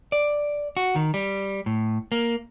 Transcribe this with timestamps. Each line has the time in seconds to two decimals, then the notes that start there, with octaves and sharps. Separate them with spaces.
0.12 D5
0.77 F#4
0.96 D#3
1.14 G3
1.66 A2
2.12 A#3